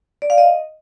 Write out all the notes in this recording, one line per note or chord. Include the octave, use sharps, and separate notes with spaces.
D5
F5
D#5